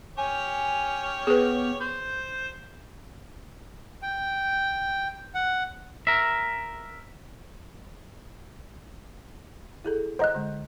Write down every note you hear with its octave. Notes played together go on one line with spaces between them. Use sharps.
C#4 G4 C#5 G#5
B3 G#4 B4
C5 G6
G5
F#5
A#4 E5
E4 G#4 A4
C5 D#5 F#5 A#5 F#6
D3 G#3